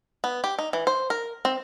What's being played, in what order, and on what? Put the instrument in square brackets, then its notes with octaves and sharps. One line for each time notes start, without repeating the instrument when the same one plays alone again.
[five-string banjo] B3
G4
D#4
E3
C5
A#4
C4